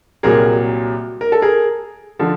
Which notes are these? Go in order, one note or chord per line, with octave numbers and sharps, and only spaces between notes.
C2 A#2 F#3 G#4 A#4
A#4
A4
G#4 A#4
D3 F3 A4